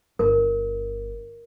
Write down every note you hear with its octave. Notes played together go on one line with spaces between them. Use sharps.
G1 A#4